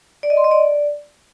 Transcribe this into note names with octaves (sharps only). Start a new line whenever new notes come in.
D5
D#5
C6
D#5
D5